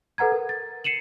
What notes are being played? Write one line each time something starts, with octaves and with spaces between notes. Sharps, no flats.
A4 B4 F#5 A#5 G#6
A#4
A6
C7 C#7 D#7 E7 F#7